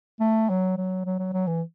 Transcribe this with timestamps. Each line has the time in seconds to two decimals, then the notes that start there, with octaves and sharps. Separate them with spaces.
0.20 A3
0.49 F#3
0.77 F#3
1.06 F#3
1.19 F#3
1.33 F#3
1.47 E3